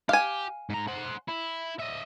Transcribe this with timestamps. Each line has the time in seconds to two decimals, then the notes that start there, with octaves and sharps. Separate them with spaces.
0.09 G4 F5 G#5
0.70 G#2 A#5
0.88 C5 F#5
1.29 E4
1.80 D#5 E5